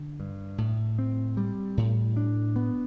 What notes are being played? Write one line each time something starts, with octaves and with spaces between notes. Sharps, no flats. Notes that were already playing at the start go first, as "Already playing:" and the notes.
Already playing: D3
G2
A2
C4
G3
A2
D4
B3